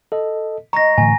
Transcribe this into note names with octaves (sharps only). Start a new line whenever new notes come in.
A4 D#5
G#3 D#5 A#5 C#6 A#6
A2 D3 E3 G#5